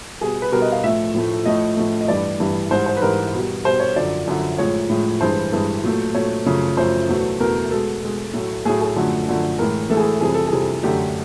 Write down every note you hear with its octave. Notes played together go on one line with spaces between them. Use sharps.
B2 G3 G#4
B4
B2 G3 A#4
D#5
F5
A2 F3 A3 E5
A2 F3 A3
A2 F3 A3 D#5
A2 F3 A3
D#5
G2 E3 G3 D5
G2 E3 G3
G#2 E3 G3 C5
C5
B4
G#2 E3 G3 A#4
B2 G3
B2 G3 C5
C#5
F#2 D3 F3 D5
F#2 D3 F3
A2 F3 G#3 C#5
A2 F3 G#3
G2 E3 G#3 C5
G2 E3 G#3
A#2 F#3 A3
A#2 F#3 A3 C#5
F#2 C#3 F3 A3
F#2 C#3 F3 A3 C5
E2 B2 F#3 A3
E2 B2 F#3 A3 A#4
B2 G#3 A4
B2 G#3
A2 F#3 A3
A2 F#3 A3 G#4
G#4
F#2 D3 F3 A3
F#2 D3 F3 A3
A2 E3 G#3 A#4
A2 E3 G#3 A4
G#4
A4
F2 C3 E3 G3 G#4
A4
G#4
F2 C3 E3 G3
F#2 D3 F#3 A3 G4